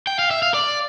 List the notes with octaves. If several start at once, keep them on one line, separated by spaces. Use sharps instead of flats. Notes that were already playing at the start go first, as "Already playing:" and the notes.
G5
F5
E5
F5
D5